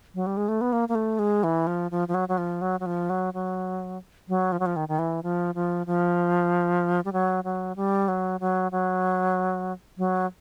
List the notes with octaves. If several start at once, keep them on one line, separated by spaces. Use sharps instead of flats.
F#3
G3
G#3
A3
B3
A#3
A#3
A3
G#3
E3
F3
F3
F3
F#3
F#3
F3
F#3
F#3
F3
F#3
F#3
F#3
F3
F#3
F3
D#3
D#3
E3
F3
F3
F3
G3
F#3
F#3
G3
F#3
F#3
F#3
F#3